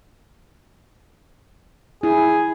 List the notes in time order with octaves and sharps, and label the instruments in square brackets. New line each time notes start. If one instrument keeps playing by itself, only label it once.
[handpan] E4 [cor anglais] G#4